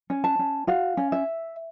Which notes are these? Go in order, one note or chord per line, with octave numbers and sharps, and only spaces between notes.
C#4
A5
C#4
F#4 F5
C#4
E5